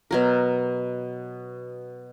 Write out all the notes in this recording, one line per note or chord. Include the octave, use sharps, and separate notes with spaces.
B2 F#3 A#4